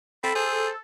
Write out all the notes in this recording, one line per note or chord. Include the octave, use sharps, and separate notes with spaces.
C4 A4 B5
G#4 C5